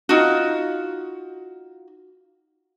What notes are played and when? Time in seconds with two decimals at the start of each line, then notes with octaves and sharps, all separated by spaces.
0.09 D#4 F4 F#4